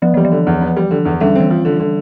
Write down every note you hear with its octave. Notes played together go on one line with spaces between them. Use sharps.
F3 B3
E3 G3
F3
D3
E2
B3
G3
D3
E2
D3 G3
E3 C4
F3
D3
D3